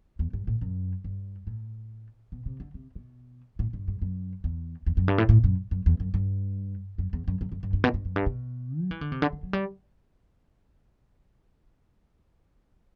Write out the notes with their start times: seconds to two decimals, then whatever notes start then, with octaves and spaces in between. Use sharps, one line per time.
0.19 E2
0.33 G2
0.47 A2
0.61 F#2
1.04 G2
1.47 A2
2.32 B2
2.46 C3
2.60 D3
2.74 C3
2.95 B2
3.59 A2
3.73 G2
3.88 G2
4.02 F#2
4.44 E2
4.86 E2
4.97 F#2
5.08 G2
5.18 A2
5.29 A2
5.44 F#2
5.71 F#2
5.86 E2
6.00 F#2
6.14 G2
6.98 F#2
7.13 E2
7.28 F#2
7.41 F#2
7.52 F#2
7.63 G2
7.73 G2
7.84 B2
7.94 G2
8.05 F#2
8.16 G2
8.26 B2
8.81 F#3
8.91 E3
9.01 D3
9.12 C3
9.22 D3
9.33 D3
9.43 F#3
9.53 G3